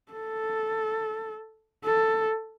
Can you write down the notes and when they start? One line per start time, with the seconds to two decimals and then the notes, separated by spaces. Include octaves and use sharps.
0.12 A4
1.85 A4